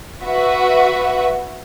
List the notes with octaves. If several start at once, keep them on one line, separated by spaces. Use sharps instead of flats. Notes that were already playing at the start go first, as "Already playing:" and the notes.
F#4 B4 E5